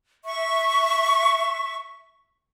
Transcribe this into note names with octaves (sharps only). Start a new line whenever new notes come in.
E5 C#6